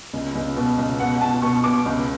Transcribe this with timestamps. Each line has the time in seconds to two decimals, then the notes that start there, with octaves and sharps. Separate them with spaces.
0.13 C#2
0.35 C#2
0.56 B2
0.78 C#2
1.00 B2 F#5
1.21 B2 A5
1.42 B2 C#6
1.64 B2 D6
1.86 C#2